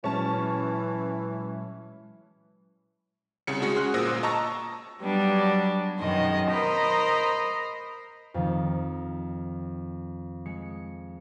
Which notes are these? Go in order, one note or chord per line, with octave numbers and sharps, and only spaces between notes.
A#2 E3 F#3 G#3 C#4 A5
C2 C#3 C#7
G#3 C#4 F#4
F#4 G#4 C6 F6 F#6
G1 A#2 C5 D#6 E6 A#6
D#5 A5 A#5 C#6 E6 A#6
F#3 G3 B3 D4
F#2 B2 D#3 G#3 D#5
A#4 C5 D#5 A#5 B5
F2 D#3
G#3 C#7